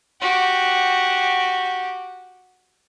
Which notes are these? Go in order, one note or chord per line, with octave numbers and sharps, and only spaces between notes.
F#4 G4